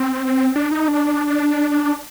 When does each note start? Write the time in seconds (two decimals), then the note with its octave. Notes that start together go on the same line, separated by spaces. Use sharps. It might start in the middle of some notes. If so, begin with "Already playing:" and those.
Already playing: C4
0.56 D4
0.71 D#4
0.88 D4